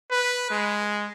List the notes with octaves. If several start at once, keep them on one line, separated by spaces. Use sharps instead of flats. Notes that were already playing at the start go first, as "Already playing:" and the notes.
B4
G#3